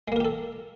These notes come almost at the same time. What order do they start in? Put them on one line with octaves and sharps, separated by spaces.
G#3 A#3 A#4 G4 A4